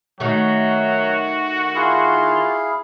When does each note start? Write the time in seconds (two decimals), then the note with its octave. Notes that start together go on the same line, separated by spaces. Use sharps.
0.20 D#3 F#3 A3 F#4
1.75 E4 F4 G#4 F5